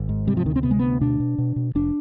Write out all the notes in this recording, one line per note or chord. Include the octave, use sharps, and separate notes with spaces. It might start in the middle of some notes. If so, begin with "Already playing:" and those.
Already playing: G#1
G#2
C3 G3
F3
D2 D#3
C4
C3 B3
G#3
D2 B3
B2 D4
B2
B2
B2
F1 D4